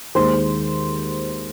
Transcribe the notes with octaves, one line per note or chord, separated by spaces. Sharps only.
D#2 D#3 G#3 C5